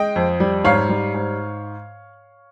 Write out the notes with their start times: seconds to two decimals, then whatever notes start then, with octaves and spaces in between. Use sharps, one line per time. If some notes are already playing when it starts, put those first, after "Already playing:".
Already playing: G#3 D#5 G5
0.16 F2
0.40 G3
0.64 G#2 C#5 F5
0.89 G3
1.14 G#2